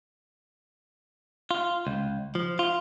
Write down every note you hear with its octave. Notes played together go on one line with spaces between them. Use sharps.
F4
C#2
F3
F4